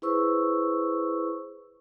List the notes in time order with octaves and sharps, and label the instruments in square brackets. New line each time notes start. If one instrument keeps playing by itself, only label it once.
[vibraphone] E4 G#4 B4 C5 C#6 E6